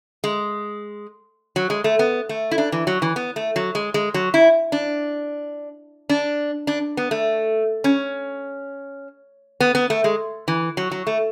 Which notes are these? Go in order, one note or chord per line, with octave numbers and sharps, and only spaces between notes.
G#3
F#3
G#3
A3
B3
A3
E4
D4
E3
F#3
E3
B3
A3
F#3
G#3
G#3
F#3
E4
D4
D4
D4
B3
A3
C#4
B3
B3
A3
G#3
E3
F#3
F#3
A3